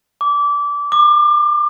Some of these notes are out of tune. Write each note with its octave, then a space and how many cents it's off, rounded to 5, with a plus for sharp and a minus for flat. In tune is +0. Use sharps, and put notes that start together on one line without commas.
D6 -20
D6 +30